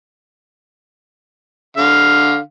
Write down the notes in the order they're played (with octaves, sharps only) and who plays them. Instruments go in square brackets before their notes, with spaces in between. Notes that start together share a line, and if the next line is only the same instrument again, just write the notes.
[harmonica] D3 F5